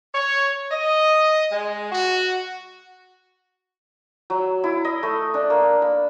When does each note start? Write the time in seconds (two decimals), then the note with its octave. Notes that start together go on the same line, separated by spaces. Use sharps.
0.13 C#5
0.70 D#5
1.52 G#3
1.90 F#4
4.30 F#3
4.64 E4
4.85 D#5
5.03 A3
5.34 D4
5.50 A#3
5.82 B5